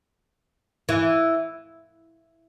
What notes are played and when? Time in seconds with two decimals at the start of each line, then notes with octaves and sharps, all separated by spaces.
0.89 E3